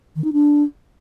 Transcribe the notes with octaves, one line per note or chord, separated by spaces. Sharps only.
D#3
D#4
D4